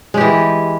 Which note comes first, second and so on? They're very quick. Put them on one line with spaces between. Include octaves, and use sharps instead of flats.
G#3 G4 E3